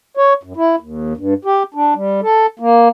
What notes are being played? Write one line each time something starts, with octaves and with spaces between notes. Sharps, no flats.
C#5
F#2
E4
D#2
G2
G4
D4
G3
A4
A#3